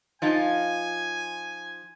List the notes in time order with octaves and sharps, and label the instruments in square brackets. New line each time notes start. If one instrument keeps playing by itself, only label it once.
[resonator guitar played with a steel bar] F3 D#4 F4 [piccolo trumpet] G#5